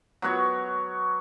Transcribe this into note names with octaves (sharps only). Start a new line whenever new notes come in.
F#3 B3 F#4 C#5